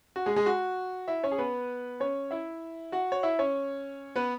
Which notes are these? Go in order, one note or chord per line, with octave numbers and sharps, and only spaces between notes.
F#4
G#3 G#4
G#3 G#4
F#4
E4 E5
C#4 C#5
G#4
B3 B4
C#4 C#5
E4 E5
F#4 F#5
C#5
E4 E5
C#4 C#5
B3 B4